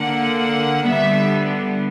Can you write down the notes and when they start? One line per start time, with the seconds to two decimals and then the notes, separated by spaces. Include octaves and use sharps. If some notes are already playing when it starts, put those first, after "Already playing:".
Already playing: D3 A#3 F#5
0.38 F#5
0.86 D3 G3 B3 E5